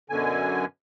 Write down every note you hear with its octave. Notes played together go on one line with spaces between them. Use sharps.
F#2 B2 D3 G#5